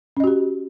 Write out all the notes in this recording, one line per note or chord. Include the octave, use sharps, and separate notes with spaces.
C#4 F#4 G4 D#5